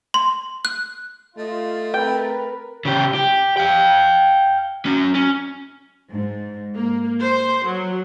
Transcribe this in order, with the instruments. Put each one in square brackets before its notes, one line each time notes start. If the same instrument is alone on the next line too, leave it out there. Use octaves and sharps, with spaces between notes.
[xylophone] C6
F#6
[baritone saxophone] A3 [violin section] F4 [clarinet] D#5
[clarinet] C4 [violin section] A#4 B4 [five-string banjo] G5
[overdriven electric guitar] C#3 G4
G4
F5 G5
C#4 F#4
C#4
[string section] G#2
A#3
C5
F#3